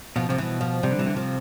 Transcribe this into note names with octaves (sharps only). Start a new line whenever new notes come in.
B2 F3
C3 F3
B2 E3
F3
C3 G3
D3
C3 E3
D3
C3 F3